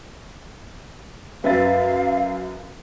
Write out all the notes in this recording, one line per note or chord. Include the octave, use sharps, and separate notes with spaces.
F#2 B4 E5 F5 A6